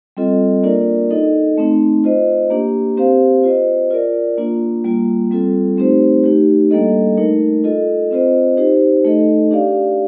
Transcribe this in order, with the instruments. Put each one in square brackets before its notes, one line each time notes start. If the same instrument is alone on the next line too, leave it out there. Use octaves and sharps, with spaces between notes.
[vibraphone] G3 C4 F4 A4 D#5
A#3 D4 F4 A#4 D5
D#4 A4 D#5
A3 C4 D#4
F4 C5 D#5
A#3 D4 G4
C4 G4 C5 F5
F4 C5 D#5
F4 A#4 D5
A#3 D4 F4
G3 A#3 F4
G3 C4 F4 A4
A3 C4 D#4 G4 C5
A3 D#4 G4
G3 A#3 D4 A4 D#5
A3 D#4 A#4
F4 A4 D#5
C4 F4 C5 D#5
D#4 G4 C5
A3 D#4 A4 D#5
D4 G4 D5 F5